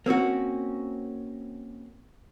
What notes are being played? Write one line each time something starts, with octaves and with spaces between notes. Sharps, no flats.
A#3 C4 C#4 F#4